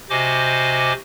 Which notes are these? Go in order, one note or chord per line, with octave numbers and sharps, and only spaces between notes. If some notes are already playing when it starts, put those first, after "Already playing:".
C3 F#4 C5 D#5 G#5 D6